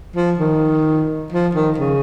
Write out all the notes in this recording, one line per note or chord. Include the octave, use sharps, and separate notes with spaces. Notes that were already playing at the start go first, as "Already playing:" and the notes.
F3
D#3
F3
D#3
C#3